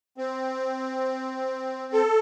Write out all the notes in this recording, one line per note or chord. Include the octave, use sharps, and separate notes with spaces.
C4
A4